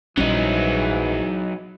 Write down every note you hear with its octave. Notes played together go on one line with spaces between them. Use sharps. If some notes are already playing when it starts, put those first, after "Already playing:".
A#1 G#2 E3 F#3 G3 C#4 D#4